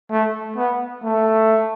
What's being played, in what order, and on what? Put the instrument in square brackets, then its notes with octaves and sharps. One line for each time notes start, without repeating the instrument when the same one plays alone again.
[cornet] A3
B3
A3